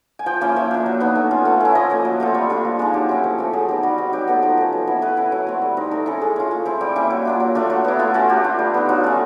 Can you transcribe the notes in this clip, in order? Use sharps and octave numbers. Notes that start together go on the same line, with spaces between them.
G#5
F3 G5
A#3 C#4 E4 F5
F3 E5
A#3 D4
F#3
B3 D#4
A3
C#4 F4
A3
C#4 E4
F3 D#5
A#3 C#4
F#3
A3 C4 F4
G3 C#5
A#3 D4 F4
F3
G#3 C4 D#4
F#3 G4
A3 C#4 E4
F3
A3 C4
F#3 G#4
B3 D#4 G4
G3 F#4
C4 D#4 F#4
F#3 G4
B3 D#4 A4
F3 A#4
A3 C#4
F#3
B3 E4
A3 B4
C#4 E4
F#3
A3 C4
G3
C4 D#4
A3 A#4
C#4 E4 A4
G#3 G#4
C#4 F4
A3
C4 E4
G3 G4
A#3 C#4 E4
F#3
A#3 D4 F4
F#3
A3 D4 F4
F#3
B3 E4
A3 F4
C#4 E4 F#4
A3 G4
D4 F4
G3
B3 D#4
F#3 F4
A3 C#4